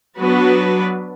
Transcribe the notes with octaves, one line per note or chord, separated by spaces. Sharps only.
F#3 B3 D4 F#4 B4